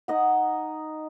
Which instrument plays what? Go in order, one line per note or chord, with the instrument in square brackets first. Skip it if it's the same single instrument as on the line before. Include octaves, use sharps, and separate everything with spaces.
[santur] D#4 D#5 F#5